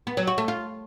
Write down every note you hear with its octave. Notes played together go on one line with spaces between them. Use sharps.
B3
F#3
F#4
A3
F4